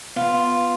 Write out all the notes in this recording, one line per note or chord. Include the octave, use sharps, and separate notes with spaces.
B3 F4